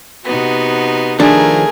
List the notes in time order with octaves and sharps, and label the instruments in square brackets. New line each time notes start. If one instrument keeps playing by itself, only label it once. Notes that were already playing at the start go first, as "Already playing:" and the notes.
[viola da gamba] C3 D#4 F#4 [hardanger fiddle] B3
[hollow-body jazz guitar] D#3 F3 D4 [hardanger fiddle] A3 A#4 [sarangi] G#4